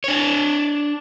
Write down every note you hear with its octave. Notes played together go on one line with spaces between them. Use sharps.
D4 C#5